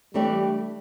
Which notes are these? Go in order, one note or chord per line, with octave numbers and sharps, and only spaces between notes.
E3 G3 A3 D4 G4 D5